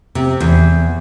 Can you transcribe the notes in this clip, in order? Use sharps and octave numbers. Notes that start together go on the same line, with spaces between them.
C3
E2